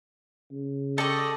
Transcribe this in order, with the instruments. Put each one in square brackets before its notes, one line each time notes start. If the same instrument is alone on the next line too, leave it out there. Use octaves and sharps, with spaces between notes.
[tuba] C#3
[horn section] G4 D5 D#5 [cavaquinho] A4 C#6